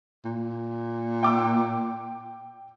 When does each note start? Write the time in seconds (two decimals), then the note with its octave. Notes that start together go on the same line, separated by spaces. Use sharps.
0.25 A#2
1.23 G5 D6 E6